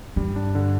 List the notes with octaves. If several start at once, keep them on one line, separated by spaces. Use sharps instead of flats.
G2 G3
D4
D3